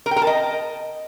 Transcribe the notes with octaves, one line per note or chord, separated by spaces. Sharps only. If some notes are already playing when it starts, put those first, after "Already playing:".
A#4
G5
A#4
A5
D#5